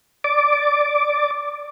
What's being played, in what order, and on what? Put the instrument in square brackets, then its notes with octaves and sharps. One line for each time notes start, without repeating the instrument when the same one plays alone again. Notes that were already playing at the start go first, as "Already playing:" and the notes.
[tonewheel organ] D5 D6